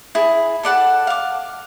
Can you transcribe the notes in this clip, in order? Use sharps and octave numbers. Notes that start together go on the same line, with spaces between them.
E4 G#4
A4 D5 F#5 A5
F5 D6